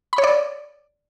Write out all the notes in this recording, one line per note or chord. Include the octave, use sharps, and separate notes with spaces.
B5
C#5
D5